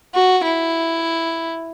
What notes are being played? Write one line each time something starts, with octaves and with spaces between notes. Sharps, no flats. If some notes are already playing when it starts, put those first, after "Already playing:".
F#4
E4